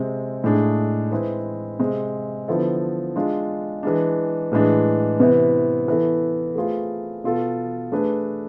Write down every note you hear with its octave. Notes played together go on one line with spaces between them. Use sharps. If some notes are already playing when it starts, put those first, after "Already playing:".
Already playing: C3 G#3 C4
A2 G#3 D4 G#4
G#3 C4 E4 G#4 B4
C3 G#3 C4
D3 F3 B3 E4 A4
G#3 D4 F4
E3 G#3 D4
A2 E3 G#3 D4
C3 E3 B3 E4
E3 B3 E4 A4
A3 C4 F4 G#4 B4
B2 B3 F4 A4
A3 D4 G#4 B4